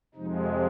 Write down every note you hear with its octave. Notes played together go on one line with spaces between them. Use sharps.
F2 C3 F3 G#3 D#4